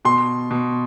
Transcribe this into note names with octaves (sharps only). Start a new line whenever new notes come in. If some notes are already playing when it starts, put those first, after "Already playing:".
B2 C6
B2